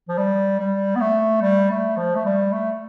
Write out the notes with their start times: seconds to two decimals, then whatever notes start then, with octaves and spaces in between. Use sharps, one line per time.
0.09 F3
0.18 G3
0.60 G3
0.95 B3
1.01 A3
1.42 G3
1.70 A3
1.97 F3
2.16 A3
2.25 G3
2.53 A3